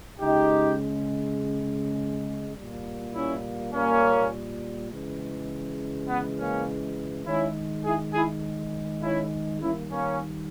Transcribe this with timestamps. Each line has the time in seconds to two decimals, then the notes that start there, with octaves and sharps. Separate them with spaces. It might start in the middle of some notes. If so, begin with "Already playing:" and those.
0.20 C#3 G#3 D#4 G4
2.56 A#2 G3 A#3
3.14 C#4 E4
3.73 A#3 C#4
4.91 C#3 E3 G#3
6.09 B3
6.38 A#3 C#4
7.26 D#3 G#3 C#4 E4
7.85 E4 G#4
8.14 E4 G#4
9.02 C#4 E4
9.62 D#3 G3 A#3 C#4 E4
9.91 A#3 C#4